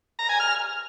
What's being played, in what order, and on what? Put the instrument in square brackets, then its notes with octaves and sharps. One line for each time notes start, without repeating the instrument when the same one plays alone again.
[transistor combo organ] A#5
G#5
F6